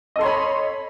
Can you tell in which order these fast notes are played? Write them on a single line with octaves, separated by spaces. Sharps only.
D#5 A4 C6 C#5 B5